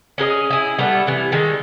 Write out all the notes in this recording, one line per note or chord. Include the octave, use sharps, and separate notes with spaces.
C#4 G#4 A#4 D#5
E4 G#4
G3 A3 B3 D4
C3 E3
D#3 G3 G#3 A4